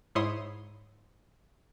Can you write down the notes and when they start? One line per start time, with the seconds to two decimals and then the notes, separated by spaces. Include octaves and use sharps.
0.15 G#2 E4 C#5 C6 D#6